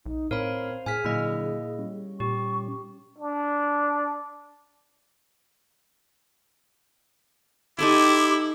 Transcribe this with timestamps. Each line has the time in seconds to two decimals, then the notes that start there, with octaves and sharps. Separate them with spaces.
0.06 B1 D#4
0.31 A2 C4 A#4 C5 C#5 F5 B5
0.86 A2 G#4 G#5 F6 B6
1.05 A#2 D3 F#3 A#3 E4 D#5
1.79 G3 C#4
2.20 A#2 G4 C#6
3.19 D4
7.79 D#4 E4 G4 A4 G#5 C6 D6